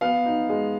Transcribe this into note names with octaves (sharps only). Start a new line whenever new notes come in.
B3 F5
D#4
G#3